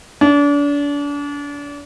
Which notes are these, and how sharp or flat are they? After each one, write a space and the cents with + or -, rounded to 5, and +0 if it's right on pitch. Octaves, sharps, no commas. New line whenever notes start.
D4 -35